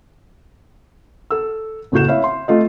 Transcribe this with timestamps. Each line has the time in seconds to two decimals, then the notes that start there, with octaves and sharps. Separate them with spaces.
1.31 A4 E6
1.92 F#1 A2 A3 F#4 G6 E7
2.08 E4 C#5 E5 F5
2.24 C6
2.48 A3 F4 D#5